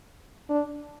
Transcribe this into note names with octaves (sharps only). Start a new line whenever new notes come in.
D4